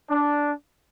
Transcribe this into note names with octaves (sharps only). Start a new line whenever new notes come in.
D4